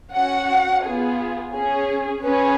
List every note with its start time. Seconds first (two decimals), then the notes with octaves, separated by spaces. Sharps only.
0.15 C#4 F#4 F#5
0.85 B3 F4 G#4
1.54 C#4 G#4
2.24 C#4 G#4 B4